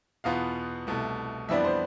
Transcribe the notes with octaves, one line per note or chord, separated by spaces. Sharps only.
E2 B2 B3 F4 F5
C2 B2 A3
F2 E3 G3 B3 D4 E5
C5